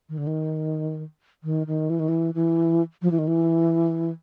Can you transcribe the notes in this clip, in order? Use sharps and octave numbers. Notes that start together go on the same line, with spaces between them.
D#3
D3
D#3
D#3
D#3
E3
D#3
E3
E3
F3
E3
D#3
E3